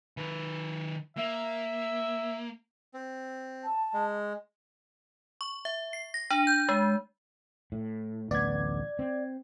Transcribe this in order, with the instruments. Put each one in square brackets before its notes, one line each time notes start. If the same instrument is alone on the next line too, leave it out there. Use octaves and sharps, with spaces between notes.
[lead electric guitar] D#3 B4
[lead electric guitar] A#3 [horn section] E5
[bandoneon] C4
[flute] A5
[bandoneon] G#3
[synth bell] C#6
E5
C7
A#6
D4
G6
G#3
[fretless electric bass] A2
[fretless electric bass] D1 A1 B3 [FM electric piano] D5 G#6
[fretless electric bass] C4